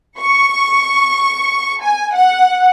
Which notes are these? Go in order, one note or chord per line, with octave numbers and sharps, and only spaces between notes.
C#6
G#5
F#5